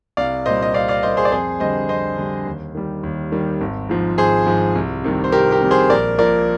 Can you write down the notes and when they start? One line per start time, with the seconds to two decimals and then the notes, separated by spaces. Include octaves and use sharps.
0.17 C2 D5 F5
0.46 A#2 G3 C5 D#5
0.62 D#5
0.74 C2 D5 F5
0.88 D5 F5
1.03 A#2 G3 C5 D#5
1.17 G#4 C5
1.25 D5
1.32 F2 G#4 C5
1.60 D3 G3 C5 D#5
1.89 F2 C5 D#5
2.18 D3 G3
2.46 D#2
2.75 D#3 G3
3.03 D#2
3.32 D#3 G3
3.61 G#1
3.90 G#2 F3
4.18 G#1 G#4 C5
4.47 G#2 F3
4.75 C2
5.04 C3 D#3 G3
5.24 C5
5.32 C2 G4 A#4
5.51 G4 A#4
5.61 C3 D#3 G3
5.71 G#4 C5
5.90 A#1 A#4 D5
6.18 A#2 F3 A#4 D5